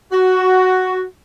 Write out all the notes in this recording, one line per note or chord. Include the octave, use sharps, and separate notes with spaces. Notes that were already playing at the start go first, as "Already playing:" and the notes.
F#4